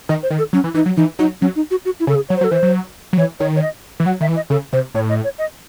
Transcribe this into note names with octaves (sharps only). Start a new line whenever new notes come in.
D#3 D#5
C5
D#3
A4
F#3 C#4
E3
E3 D#4
F#3
E3 D#4
F#3 D#4
F#3 C#4
D#4
F#4
F#4
E4
C#3 A4
G#4
F#3 C#5
C5
F#3
A4
E3 C5
F#3
F#3
E3 C#5
D#3 C#5
C#5
D#5
E3
F#3 F#5
D#3 E5
E3
D#5
C#3 A4
C3 C5
A2 C#5
D#5
C#5
D#5